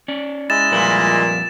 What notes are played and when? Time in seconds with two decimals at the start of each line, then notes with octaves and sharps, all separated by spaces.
0.08 C#4 D5
0.50 G#3 E4 D#5 A6 E7
0.72 F2 A#2 G3 B4